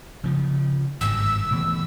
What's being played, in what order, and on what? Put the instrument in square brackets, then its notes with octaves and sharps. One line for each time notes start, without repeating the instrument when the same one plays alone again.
[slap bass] C#3 F3
[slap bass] G#1 G2 [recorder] E6
[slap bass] B2 E3 A3